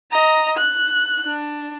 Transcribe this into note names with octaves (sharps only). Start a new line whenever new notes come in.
D#5 A#5
F#6
D4